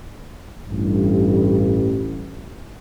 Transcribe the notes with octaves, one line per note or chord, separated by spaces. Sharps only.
A1 G2